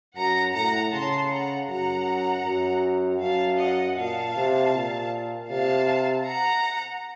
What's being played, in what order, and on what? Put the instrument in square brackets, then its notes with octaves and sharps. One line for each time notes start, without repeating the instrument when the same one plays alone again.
[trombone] F#2 [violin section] F#5 A#5
[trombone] A2 [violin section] F#5 A#5
[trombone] C#3 [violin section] A5 C6
[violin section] F#5 A#5
[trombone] F#2 [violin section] F#5 A#5
[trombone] F#2
[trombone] F#2 [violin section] F5 A5
[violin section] D#5 F#5
[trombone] A#2 [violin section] F5 A5
[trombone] C3
A#2
[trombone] C3 [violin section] F5 A5
[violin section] F#5 A#5